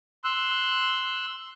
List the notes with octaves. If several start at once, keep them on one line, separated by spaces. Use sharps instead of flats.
C6 E6 F#6